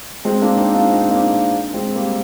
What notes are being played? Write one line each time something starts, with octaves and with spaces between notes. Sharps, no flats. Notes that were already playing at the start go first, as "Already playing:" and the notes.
G#3 C4
A#3 D4
C4 D#4
D4 F4
C4 D#4
A#3 D4
G#3 C4
G3 A#3